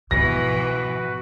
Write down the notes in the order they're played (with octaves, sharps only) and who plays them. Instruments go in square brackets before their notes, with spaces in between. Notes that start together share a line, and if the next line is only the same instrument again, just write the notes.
[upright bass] G#2 B2 [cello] E3 F3 [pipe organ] F#4 B4 [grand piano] A#6